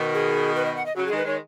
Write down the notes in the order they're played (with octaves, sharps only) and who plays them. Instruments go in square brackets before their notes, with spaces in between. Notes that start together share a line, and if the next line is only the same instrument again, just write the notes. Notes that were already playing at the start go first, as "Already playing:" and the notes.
Already playing: [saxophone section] B2 D#3
[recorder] G#4
B4
D#5
F#5
D#5
[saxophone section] C#3 F#3 [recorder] F#4
[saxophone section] D#3 G#3 [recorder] G#4
[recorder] B4
[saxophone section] D#3 G#3 [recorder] C#5